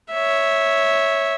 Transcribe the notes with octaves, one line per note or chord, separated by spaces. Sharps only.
C#5 E5